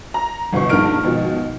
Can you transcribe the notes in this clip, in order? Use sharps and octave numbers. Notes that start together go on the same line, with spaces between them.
A#5
G1 C2 B2 C#6
A#1 G2 D#4 A#4 F6 D7
G#1 B2 F3